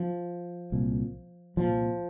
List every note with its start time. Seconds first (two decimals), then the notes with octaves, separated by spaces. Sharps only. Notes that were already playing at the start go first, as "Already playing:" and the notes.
Already playing: F3
0.72 C2 A#2
1.57 C2 A#2 F3